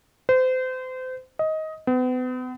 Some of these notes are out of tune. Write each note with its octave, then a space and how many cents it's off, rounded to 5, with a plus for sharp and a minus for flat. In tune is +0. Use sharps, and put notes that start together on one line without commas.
C5 -30
D#5 +15
B3 +40